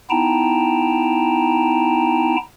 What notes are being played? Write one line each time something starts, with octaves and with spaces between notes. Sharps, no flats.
B3 D#4 E4 G5 A5 A#5